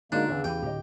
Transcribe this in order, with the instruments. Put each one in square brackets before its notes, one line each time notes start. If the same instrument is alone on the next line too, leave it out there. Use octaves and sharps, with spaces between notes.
[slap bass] D3 [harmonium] G#3 A#3 [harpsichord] D4 [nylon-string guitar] D#4 F#4
[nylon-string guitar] E2 E5 [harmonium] C#3
[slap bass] E2 E3 [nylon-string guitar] G4 [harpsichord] G5
[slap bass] D1 [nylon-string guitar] G4 D#5